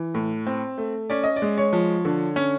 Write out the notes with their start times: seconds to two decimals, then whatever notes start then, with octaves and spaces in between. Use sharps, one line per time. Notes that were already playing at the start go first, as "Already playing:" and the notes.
Already playing: E3
0.14 A2
0.47 C4
0.78 A3
1.10 C#4 D5
1.24 D#5
1.36 D5
1.42 G#3
1.58 C#5
1.73 F3
2.05 D3
2.36 C#4